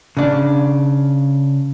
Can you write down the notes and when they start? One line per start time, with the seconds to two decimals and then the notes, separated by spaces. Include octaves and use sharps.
0.17 C#3 D4